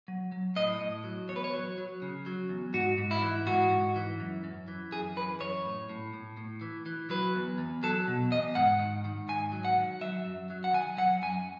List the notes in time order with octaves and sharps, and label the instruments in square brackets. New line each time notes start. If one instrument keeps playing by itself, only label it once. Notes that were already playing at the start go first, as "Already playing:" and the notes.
[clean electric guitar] F#3
F#3
A2 D#5
A2
F#3
E2 C#5
B4
C#5
F#3
F#3
C#3
F#3
E2
G#2 F#4
G#2
E4
E3
G#2 F#4
G#2
E3
F#2
F#2
E3
F#2 G#4
E3 B4
F#2 C#5
A2
A2
A2
A2
E3
E3
F#3 B4
E2
E2
F#3 A4
B2
E2 D#5
G#2 F#5
D#3
D#3
G#2 G#5
F#3
F#5
D#3
F#3 E5
F#2
F#3
F#5
D#3 G#5
F#3 F#5
F#2 G#5